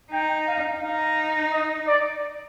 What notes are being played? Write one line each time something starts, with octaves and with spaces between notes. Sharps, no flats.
D#4 G5
F5
D#4 F5
D#5
D5